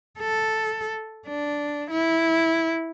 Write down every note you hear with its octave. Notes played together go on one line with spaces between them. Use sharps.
A4
D4
E4